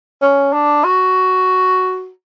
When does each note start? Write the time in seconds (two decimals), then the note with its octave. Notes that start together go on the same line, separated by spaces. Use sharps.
0.22 C#4
0.53 D4
0.84 F#4